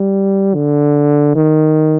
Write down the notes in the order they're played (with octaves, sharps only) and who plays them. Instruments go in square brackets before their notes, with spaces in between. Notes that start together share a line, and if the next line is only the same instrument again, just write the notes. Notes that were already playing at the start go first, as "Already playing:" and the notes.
Already playing: [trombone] G3
D3
D#3